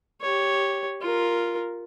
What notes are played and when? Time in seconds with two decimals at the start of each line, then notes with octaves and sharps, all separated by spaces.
0.21 G4 C#5
1.02 F4 A#4